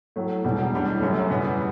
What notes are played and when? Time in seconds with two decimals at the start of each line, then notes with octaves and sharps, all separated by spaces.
0.16 A2 F#3 A3
0.44 E1 E2 B2 G3
0.73 B1 A2 G3 D4
1.01 G1 F#2 C#3 F#3 A3
1.30 E2 B2 G3 B3